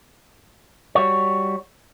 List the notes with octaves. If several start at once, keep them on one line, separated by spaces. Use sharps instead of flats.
G3 F#4 C#5